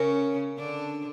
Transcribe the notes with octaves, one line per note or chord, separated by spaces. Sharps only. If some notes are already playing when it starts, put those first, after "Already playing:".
Already playing: C#3 C#4 A#4
D3 D4